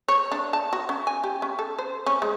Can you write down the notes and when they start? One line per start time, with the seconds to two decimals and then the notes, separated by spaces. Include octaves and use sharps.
0.08 C#5
0.32 D4
0.53 A5
0.73 F#4
0.89 C#4
1.07 G#5
1.24 G4
1.42 C#4
1.59 A4
1.79 C5
2.06 C#4
2.22 G#3